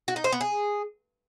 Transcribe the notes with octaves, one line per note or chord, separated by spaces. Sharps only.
F#4
D#4
C5
B3
G#4